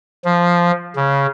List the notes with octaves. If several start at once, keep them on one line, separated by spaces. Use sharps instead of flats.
F3
C#3